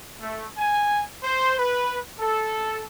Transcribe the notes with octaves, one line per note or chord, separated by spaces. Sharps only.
A3
G#5
C5
B4
A4